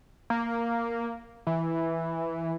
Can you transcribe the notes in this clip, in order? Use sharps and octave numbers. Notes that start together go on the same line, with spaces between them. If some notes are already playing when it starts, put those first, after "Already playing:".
A#3
E3